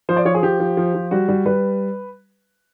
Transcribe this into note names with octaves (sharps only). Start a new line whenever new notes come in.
F3 C5
D5
F3 C#5
G#4
F3 G4
F3
F3
F3
G3 F#4
G3
G3 B4